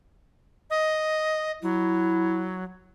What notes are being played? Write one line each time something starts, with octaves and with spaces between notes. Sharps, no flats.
D#5
F#3 E4